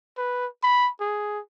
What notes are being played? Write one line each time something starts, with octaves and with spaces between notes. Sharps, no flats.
B4
B5
G#4